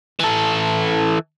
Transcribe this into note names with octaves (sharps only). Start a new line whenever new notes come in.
E3 A4